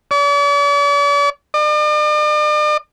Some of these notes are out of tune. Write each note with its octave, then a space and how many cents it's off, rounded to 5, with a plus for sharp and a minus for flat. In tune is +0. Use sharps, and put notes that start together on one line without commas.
D5 -45
D5 +45